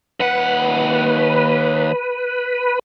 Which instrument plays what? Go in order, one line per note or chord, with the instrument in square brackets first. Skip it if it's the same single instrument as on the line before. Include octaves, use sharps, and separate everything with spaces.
[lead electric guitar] D#2 F#5 [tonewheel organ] B4